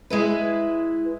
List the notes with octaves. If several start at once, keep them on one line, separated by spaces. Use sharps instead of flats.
G#3 E4 B4